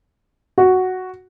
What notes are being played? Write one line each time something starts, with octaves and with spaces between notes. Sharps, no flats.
F#4